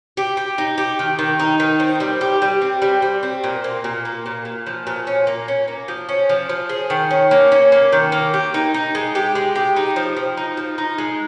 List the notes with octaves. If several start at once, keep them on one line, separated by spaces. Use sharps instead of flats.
G4
G4
D#4
G4
D#3
D#3
D#4
D#3
C4
G3
G4
G3
C4
G3
G3
C4
A#2
A#3
A#2
A#3
A#2
A#2
F3
A#2
C#4
A#3
C#4
A#3
F3
C#4
F3
F3
G#4
D#3
C#4
A#3
C#4
A#3
D#3
A#3
G4
D#4
D#4
G#3
G4
G#3
G4
D#4
F3
F3
D#4
F3
D#4
G#3